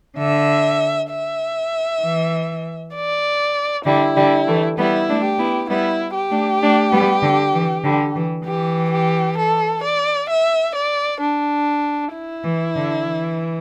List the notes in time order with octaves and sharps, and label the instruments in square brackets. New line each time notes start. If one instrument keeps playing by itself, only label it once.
[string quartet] D3 [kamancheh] E5
[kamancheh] E5
[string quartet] E3
[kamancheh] D5
[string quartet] D3 G3 [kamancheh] E4
[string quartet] D3 G3
E3 A3
[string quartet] G3 B3 [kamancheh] E4
[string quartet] A3 D4
[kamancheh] G4
[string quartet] B3 E4
[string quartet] G3 B3 [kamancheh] E4
[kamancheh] G4
[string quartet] A3 D4
A3 D4
G3 B3
D3
E3
D3 G3
E3
[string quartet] E3 [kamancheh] G4
[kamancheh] G4
A4
D5
E5
D5
D4
E4
[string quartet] E3
D3
E3